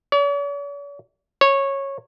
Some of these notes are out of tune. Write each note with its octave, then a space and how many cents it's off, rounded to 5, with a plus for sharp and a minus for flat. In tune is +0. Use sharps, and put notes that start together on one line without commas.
C#5 +45
C#5 -15